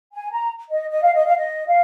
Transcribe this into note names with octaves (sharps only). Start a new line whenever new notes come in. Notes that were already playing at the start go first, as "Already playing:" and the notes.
G#5
A#5
D#5
D#5
F5
D#5
F5
D#5
F5